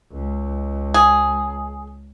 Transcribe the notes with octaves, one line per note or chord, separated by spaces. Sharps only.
C#2
G#4